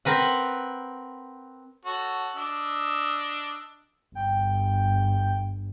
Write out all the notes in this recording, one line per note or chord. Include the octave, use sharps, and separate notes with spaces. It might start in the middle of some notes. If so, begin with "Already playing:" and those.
C4 A#4 B4 F#5
F#4 A4 C#5
D4 D#5 E6
G1 G5